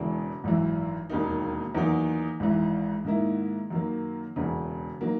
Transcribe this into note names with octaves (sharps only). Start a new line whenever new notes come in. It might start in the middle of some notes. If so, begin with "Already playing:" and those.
Already playing: E1 E2 C#3 E3 G#3
G#1 F#2 E3
E1 D#2 D#3 A#3 D#4
E2 D#3 F#3 A#3 D#4
G#1 G#2 E3
G#2 D#3 A#3 E4
F#2 D#3 F#3 A#3
E1 E2 C#3
D#3 F#3 A#3